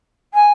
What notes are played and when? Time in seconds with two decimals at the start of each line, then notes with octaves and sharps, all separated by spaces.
0.34 G#5